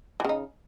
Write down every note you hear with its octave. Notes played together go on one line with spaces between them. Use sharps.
C#3 E3 D#4